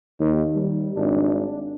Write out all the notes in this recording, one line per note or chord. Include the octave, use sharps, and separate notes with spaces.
D#2 D#3
G3
G#1 D4